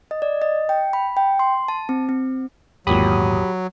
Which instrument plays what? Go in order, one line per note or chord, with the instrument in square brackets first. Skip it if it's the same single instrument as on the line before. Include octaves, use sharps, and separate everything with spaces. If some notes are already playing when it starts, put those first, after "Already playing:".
[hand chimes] D#5
D5
D#5
G5
B5
G5
C6
A5
C4
C4
[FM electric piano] G#1 A#2 D#6 [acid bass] E2 [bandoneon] F#3 [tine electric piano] G4 B5